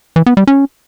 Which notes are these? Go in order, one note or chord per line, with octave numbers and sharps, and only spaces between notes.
E3
B3
G3
C#4